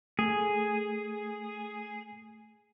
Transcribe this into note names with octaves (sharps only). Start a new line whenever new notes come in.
A3 G#4